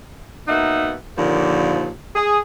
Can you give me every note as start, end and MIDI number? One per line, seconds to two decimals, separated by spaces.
0.48 0.94 47
0.48 0.94 58
0.48 0.94 63
0.48 0.94 76
0.48 0.94 78
1.17 1.89 39
1.17 1.89 46
1.17 1.89 50
1.17 1.89 53
2.16 2.38 68